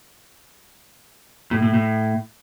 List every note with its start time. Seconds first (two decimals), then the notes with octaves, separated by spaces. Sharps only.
1.51 A2
1.62 A2
1.74 A2